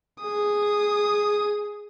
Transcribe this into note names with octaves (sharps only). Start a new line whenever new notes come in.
G#4 D#6